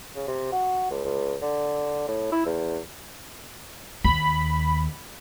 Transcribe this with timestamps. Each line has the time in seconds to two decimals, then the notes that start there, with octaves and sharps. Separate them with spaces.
0.16 C#3
0.28 C3
0.52 F#4
0.91 C#2
1.05 C#2
1.42 D3
2.08 A2
2.32 E4
2.46 E2
4.04 D#2 B5